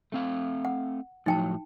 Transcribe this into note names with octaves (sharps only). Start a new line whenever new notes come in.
A3 C4 F5
F#5
A2 F3 F#3 D#4 G5 A5